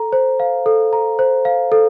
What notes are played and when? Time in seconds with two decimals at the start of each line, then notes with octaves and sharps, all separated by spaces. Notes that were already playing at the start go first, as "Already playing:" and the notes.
Already playing: A4 A#5
0.13 C5
0.40 F5
0.66 A4
0.93 A#5
1.19 C5
1.45 F5
1.72 A4